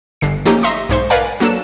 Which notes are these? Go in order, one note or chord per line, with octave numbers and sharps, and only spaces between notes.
G1 D3 C7
F3 A3 A#3 C#4 D#4 G4
D#5 E5 A#5 C6 C#6
B1 G#2 C5 C#6
A#4 B4 D5 F5 F#5 G#5
F#3 A#3 D4 A4 E7